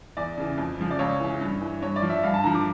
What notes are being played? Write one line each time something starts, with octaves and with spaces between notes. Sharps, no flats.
E2 D5
C#3 E3
F2
C#3 F3
D5
C#2 C#5
C#3 E3
G2
E3
G2 C#5
D5
F3
E5
G2 F5
A5
D3 F3 A#5
D6